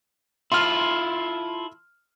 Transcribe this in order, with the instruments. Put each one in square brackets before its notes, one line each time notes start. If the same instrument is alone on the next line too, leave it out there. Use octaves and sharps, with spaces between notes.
[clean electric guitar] E4 F4 A4 [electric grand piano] C6 F6